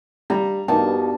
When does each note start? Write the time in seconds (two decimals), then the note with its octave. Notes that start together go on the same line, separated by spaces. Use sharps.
0.30 G3 A#5
0.68 G2 B2 A#3 D#4 A5